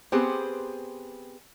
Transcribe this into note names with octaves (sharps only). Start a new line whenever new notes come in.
B3 C4 G4 G#4 B4 C5